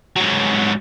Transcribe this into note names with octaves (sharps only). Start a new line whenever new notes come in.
G#2 F#3